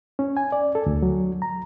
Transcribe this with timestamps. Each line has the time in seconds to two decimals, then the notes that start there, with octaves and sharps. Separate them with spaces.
0.19 C#4
0.37 G#5
0.52 D5
0.75 A4
0.86 D2
1.02 F#3
1.42 A#5